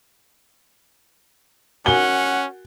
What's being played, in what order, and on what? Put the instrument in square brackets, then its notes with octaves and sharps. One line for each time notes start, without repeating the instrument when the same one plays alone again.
[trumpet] C#4 [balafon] F#4 A#4 G#5 [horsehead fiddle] F#5 [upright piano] G7